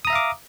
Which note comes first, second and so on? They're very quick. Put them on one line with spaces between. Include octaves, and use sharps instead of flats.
D#6 A#5 E5 F5 D6